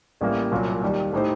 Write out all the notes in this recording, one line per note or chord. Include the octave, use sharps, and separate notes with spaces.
A1 A2 G3 A#3
C2 A#2 F#3 A#3 F#4
D#2 D#3 G3
A2 A3 D#4 G4 C5